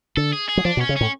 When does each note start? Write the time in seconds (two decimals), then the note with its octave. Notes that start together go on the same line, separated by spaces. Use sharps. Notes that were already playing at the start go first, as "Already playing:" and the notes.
0.17 D3 A4
0.33 G#4
0.49 G#4
0.57 F#3
0.65 F3 D4
0.77 B2
0.81 C#4
0.89 C#3
0.96 A2 C#4